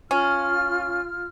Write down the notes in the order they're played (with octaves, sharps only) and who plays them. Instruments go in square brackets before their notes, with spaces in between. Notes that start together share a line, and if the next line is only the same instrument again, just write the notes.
[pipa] C#4 [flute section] F4 F6